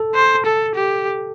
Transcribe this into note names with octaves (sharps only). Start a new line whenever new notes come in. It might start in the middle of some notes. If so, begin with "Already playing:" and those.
Already playing: A4
C5
A4
G4